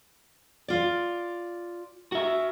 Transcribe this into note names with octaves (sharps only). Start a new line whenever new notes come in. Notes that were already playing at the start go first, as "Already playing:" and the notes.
F4 D5
F#4 E5